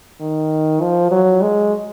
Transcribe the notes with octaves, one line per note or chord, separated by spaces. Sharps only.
D#3
F3
F#3
G#3